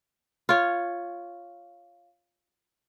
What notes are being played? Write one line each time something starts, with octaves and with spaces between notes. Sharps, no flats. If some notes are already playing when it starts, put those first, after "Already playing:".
F4 C#5